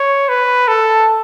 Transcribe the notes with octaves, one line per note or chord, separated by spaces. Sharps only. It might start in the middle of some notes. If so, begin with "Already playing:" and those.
Already playing: C#5
B4
A4